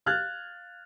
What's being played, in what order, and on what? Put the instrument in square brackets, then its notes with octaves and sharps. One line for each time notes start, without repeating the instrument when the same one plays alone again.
[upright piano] F5 F6 F#6 G#6 A6